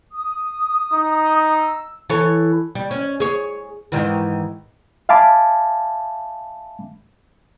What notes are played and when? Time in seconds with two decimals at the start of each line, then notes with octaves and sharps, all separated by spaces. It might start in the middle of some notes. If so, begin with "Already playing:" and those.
0.12 D#6
0.93 D#4
1.58 E6
2.10 E3 A4 C#5
2.75 G3
2.91 C#4
3.20 G#4 C#5
3.92 G#2 D#3 E3
5.09 E5 F5 G#5 A5 B5 D6